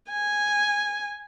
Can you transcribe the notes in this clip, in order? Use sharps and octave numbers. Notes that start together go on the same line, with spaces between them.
G#5